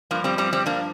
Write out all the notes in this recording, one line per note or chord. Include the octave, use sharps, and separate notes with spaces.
G2 F3 A#3
G3 C4
G3 C4
G3 C4
A#3 D4